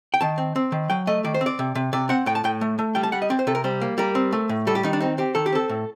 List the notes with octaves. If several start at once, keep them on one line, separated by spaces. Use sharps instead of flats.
G5
D#3 A5
C4
C4
D#3
F#3 G5
A3 D#5
D#3 D5
C5
C4
D5
C3
C3
C3 D5
C4 F#5
A2 G5
A5
A2 G5
A3
A3
G3 G5
A5
G3 F#5
D#5
C4 D5
C5
C3 A4
A#4
G3 C5
A#3
G3 A#4
C4
A3
A2
G3 A4
G4
D#3 D#4
D4
C4 D#4
C4 G4
D#3 A4
G4
C4 A4
A2